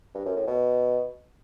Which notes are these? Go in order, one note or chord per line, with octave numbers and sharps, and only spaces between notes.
G2
F#2
A2
B2